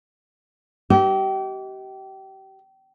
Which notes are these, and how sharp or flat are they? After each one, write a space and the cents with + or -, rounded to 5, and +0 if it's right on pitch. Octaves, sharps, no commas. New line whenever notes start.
G4 -30 D#5 +30